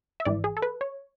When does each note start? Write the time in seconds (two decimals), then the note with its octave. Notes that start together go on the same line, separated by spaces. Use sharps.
0.20 E5
0.25 G#1 G#2 E3 D5
0.44 G#4
0.57 A4
0.62 B4
0.81 C#5